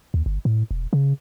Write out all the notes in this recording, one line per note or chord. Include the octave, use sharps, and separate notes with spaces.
D#2
G1
A2
E1
C#3